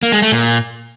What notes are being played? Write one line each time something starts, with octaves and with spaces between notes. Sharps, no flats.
A#3
G#3
A3
A#2